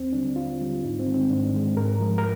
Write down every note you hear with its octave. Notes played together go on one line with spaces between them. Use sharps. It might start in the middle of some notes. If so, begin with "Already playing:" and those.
Already playing: D#2 C4
D3 G3 D4
D#2 F4
D3 G3
G#2 D#4
C4
D#3 G#3
C4
G#2 D4
D#3 G#3
G#2 A#4
F3 G#3
A#4